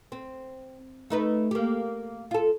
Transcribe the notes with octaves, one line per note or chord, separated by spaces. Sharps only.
C4
A3 D#4 B4
A#3 G4
F4 A4